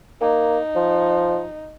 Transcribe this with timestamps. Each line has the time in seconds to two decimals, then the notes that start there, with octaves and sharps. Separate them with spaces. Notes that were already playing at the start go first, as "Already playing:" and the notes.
0.22 A#3 D#4
0.76 F3